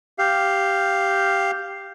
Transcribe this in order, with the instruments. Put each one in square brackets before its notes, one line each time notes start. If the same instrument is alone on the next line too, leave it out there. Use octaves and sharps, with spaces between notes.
[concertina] G4 F5